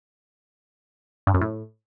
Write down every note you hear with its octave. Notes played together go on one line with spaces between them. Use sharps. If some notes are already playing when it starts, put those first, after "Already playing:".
G2
F#2
A2